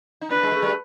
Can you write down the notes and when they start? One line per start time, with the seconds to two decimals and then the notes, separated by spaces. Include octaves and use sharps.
0.21 D#4
0.31 D4 B4
0.43 G#3
0.52 A3
0.62 G3